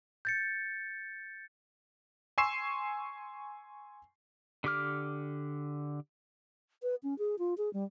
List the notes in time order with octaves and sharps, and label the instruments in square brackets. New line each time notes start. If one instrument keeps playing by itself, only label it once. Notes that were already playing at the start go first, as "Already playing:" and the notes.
[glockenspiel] G6 A6 C#7
[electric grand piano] G#5 C6 C#6 E6 C7 E7
[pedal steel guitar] D3 G4 D6 F6
[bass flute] B4
C#4
G#4
F4
G#4
G3